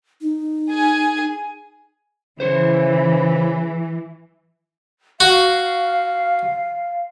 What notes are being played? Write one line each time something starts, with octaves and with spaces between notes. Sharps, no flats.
D#4
G#4 G#5
C#3 E3 C5 C#5
F#4 F5